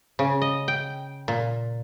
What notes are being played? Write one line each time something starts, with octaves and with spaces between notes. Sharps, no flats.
C#3
D#5
G5
A#2